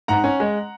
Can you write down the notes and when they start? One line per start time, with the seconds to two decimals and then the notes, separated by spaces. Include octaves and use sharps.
0.08 G#2 F#5 A#5
0.24 C#4
0.40 G#3